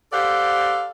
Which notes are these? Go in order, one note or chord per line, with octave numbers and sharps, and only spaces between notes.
G4 A4 C5 D5 F5 F#5